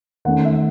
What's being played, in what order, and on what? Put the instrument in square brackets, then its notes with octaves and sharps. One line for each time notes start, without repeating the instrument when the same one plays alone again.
[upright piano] D#3 A3 C#4 F#5
E5